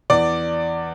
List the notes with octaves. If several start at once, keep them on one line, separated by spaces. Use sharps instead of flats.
E2 D5